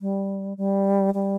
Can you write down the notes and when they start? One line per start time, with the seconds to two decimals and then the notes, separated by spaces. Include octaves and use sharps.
0.01 G3
0.57 G3
1.14 G3